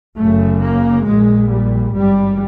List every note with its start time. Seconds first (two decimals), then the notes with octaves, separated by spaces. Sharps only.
0.18 F#1 F#2 C#3 A3
0.62 A#3
1.06 A#1 A#2 G#3
1.50 G3
1.94 G#1 G2 G3